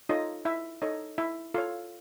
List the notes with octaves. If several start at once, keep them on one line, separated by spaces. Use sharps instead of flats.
D#4 F4 A4 C#5 D#5
E4 E5
D#4 A4 C#5 D#5
E4 E5
F4 A4 C#5 F5